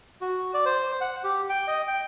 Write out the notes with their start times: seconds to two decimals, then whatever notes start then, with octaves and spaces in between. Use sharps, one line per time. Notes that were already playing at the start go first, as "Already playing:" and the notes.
0.21 F#4
0.54 D5
0.65 C5
1.01 F#5
1.24 G4
1.49 G5
1.68 D#5
1.88 G5